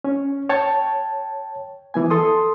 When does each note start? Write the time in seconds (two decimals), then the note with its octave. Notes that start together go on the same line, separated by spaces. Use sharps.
0.04 C#4
0.49 C#5 G5 A5
1.94 E3 B3 G#5
2.10 A4 C6 D#6